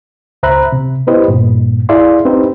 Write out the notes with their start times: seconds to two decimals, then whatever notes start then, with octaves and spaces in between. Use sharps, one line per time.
0.43 C#2 C5 E5 A#5 B5 F#6
0.72 C3
1.07 B3 E4 G4 B4 C5 D#5
1.28 G2 A#2
1.89 E4 G#4 D5 E5 F5 C6
2.25 C4 D#4 G4 B4 C5